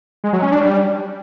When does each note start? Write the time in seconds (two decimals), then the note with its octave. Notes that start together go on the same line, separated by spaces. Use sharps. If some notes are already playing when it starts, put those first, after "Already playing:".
0.24 G#3
0.33 F#3
0.42 C#4
0.52 D4
0.61 G3